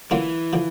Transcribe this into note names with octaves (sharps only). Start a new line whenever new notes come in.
D3 E3 F#3 A#3 C#4 F4
D3 F3